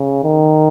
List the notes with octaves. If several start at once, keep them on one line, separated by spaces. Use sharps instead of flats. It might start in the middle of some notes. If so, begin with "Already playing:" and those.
Already playing: C#3
D#3